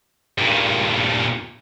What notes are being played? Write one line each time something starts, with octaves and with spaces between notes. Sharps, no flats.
G2 A#2